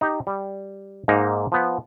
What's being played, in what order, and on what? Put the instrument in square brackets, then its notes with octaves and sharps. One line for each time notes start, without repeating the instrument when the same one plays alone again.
[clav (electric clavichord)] D#4 G4
G3
G#2 A#3 D#4
F3 B3